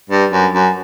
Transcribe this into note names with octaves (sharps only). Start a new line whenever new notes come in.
G2
F#2
F#2